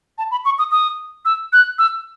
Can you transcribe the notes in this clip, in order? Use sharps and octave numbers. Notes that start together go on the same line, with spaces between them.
A5
B5
C#6
D#6
D#6
E6
F#6
E6